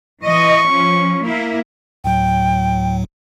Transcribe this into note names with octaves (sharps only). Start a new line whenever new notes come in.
E3 D#5 C#6
F3 C#4
A#3 E4
D2 A2 F#3 G5